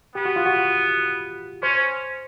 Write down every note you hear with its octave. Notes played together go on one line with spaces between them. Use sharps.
B3 G4
F#4
F4
F#4
C#4 C5